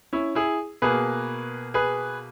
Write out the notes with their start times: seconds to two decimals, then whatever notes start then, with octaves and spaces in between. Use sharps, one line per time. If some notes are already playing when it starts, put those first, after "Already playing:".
0.13 C#4 E4
0.35 E4 G#4
0.82 B2 A#3 G#4 B4
1.74 G#4 B4